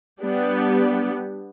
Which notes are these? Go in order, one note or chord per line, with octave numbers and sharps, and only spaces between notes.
G3 B3 D4 G4